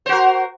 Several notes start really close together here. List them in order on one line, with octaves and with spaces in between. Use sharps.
C5 F#4 A#4